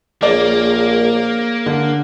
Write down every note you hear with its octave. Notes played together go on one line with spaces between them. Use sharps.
A#1 A#3 G#4 C#5 D5 D6
D3